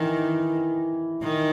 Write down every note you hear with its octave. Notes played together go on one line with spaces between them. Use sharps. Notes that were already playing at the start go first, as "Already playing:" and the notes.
Already playing: D#3 E3
D#3